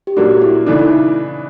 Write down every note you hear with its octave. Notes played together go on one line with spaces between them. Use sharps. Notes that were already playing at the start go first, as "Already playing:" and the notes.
G4
A#2 F#3 A#3 D4 F#4
E4
C#3 E3 A3 D4 D#4
E4